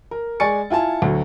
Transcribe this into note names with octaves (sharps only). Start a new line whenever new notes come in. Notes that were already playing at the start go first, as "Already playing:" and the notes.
A#4
G#3 D5 G#5 C#6 A6 C#7
E4 F4 G#5 A5
D2 F#3